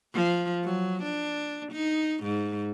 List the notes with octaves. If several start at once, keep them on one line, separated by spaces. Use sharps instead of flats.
F3
F#3
D4
D#4
G#2